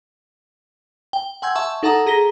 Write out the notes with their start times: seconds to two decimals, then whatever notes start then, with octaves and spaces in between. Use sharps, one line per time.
1.13 G5
1.42 F#5 G#5 C6 E6 G6 G#6
1.55 E5 A5 C#6 E6
1.83 D#4 A4 F#5 A5 A#5 D#6
2.06 G#4 A#5 A#6 B6 G7